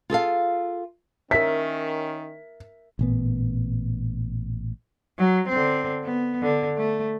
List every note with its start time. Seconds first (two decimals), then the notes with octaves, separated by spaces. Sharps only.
0.10 F4 G#4 A4 F5
1.31 D#3 C#4 A#4 E5 B6
2.99 A1 A#2 B3
5.18 F#3
5.49 D3 C4
6.04 B3
6.43 D3
6.77 A3